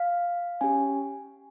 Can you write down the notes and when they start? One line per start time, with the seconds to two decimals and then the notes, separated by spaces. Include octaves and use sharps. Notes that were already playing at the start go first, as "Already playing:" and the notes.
Already playing: F5
0.61 C#4 G4 G#5